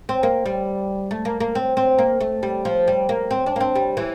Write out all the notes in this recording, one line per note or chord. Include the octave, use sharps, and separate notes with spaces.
C4
A#3
G3
A3
A#3
A#3
C4
C4
A#3
A3
G3
F3
G3
A#3
C4
D4
A#3
C4
G3
E3